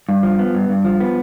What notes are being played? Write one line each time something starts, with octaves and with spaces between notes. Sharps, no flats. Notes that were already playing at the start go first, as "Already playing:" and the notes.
G2
F3
B3
G2
G2
F3
B3